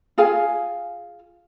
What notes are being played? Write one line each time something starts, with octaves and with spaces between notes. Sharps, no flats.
F4 G#4 F5 G#5